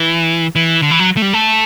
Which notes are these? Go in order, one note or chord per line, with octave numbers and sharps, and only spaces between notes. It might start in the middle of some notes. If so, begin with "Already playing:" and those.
Already playing: E3
E3
D3
E3
F#3
A3
G3
A3